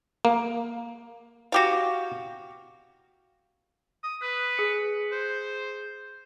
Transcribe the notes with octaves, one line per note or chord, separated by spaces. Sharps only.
A#3
F#4 G4 F5
D#6
B4 F#6
G#4 C#7
C5